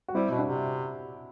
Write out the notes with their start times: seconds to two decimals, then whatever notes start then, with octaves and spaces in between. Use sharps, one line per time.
0.08 F#4
0.15 G3 C4 E4
0.31 B2
0.38 D4 F#4
0.47 C3